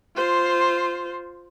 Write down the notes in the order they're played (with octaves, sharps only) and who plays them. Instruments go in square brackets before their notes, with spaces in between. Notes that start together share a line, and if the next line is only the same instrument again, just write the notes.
[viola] F4 C5